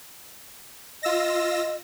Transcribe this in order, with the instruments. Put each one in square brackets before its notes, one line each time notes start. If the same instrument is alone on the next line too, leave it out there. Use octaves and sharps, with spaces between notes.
[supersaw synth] F4 E6 A#6 [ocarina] D#5